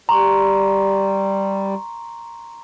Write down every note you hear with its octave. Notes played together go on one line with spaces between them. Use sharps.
G3 A#5 C6 C#6